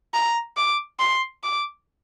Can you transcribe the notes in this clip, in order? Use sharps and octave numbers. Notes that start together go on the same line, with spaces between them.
A#5
D6
C6
D6